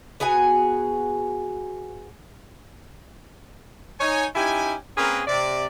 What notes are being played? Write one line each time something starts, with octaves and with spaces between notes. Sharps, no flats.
B3 F#4 G#4 G#5
D#4 C#5 G#5
C#4 D#4 E4 G4 G#5
A#3 C4 C#4 G#4 A#4 B4
C3 D5